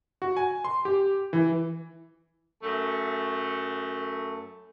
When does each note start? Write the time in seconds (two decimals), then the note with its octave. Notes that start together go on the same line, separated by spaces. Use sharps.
0.22 F#4
0.37 G#5
0.65 C6
0.85 G4
1.33 E3
2.63 F#2 A3